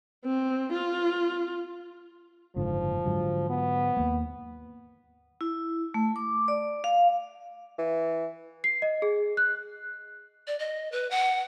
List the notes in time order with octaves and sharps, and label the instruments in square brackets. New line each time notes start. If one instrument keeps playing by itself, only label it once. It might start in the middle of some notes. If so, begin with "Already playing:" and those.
[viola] C4
F4
[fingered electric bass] F#1 G#2 D3 [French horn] F3
[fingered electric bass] G#2 D3 F#3
[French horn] B3
[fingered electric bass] D#2 A#3
[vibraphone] E4
A3
D6
D5
F5
[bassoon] E3
[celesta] C7
D#5
G#4
F#6
[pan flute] D5
D#5
B4
F#5